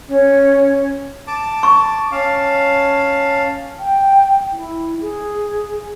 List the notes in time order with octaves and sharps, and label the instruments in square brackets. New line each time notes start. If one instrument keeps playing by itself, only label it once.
[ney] C#4
[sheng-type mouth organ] A5 D6
[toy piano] C#6
[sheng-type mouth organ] C#4 F5 A5
[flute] G5
E4
G#4